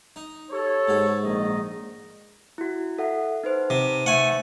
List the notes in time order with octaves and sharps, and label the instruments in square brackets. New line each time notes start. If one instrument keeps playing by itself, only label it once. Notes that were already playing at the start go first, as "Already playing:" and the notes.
[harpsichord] D#4
[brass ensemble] G4 A4 C#5
[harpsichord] G#2 F#4
[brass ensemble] A#1 D#3 D#5
[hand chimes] E4 F#4
A4 E5 F#5
D#4 B4 C5
[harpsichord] C3
[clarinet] A3 [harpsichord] F#5 G#5